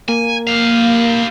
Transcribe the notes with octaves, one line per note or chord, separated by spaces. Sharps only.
A#3 G#5
G4 F5